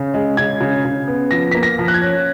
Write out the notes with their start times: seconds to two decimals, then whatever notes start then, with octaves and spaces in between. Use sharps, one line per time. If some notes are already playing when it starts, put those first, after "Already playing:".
Already playing: C#3
0.14 G#3
0.37 C#3 G#6
0.61 C#3
0.85 C#3
1.08 B3
1.31 F3 A#6
1.51 A#3 B6
1.63 A#6
1.79 F3
1.88 F#6
1.94 G#6
2.02 C#4